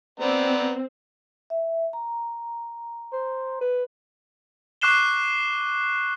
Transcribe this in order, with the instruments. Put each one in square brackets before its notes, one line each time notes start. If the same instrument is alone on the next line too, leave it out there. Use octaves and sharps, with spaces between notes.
[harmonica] B3 D5 A#5 [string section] C4
[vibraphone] E5
A#5
[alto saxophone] C5
B4
[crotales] C#6 D6 F#6 C7 E7 G7